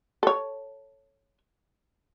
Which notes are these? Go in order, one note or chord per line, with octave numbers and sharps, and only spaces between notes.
A4 C#5